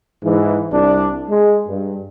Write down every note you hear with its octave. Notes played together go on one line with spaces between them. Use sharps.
G#2 E3
C2 D4
G#3
G2